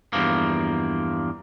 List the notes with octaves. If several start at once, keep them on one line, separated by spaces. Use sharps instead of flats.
E2 G2 F3 A#3